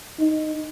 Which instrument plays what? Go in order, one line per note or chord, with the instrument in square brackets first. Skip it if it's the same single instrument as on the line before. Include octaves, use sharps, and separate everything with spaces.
[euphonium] D#4